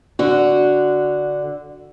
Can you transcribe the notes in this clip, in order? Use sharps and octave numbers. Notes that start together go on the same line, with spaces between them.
D3 F#4